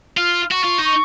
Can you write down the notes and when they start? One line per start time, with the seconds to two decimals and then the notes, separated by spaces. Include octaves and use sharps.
0.17 F4 F6
0.51 F#4 C#6
0.64 F4
0.79 D#4
0.85 C#6